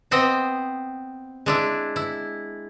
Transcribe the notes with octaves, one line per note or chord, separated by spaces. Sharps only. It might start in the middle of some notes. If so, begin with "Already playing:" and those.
B3 C4 C5 D#5
G#3 D4 E4
E4